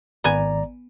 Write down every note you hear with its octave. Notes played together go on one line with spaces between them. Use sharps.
G#1 B3 D5 G#5 A#5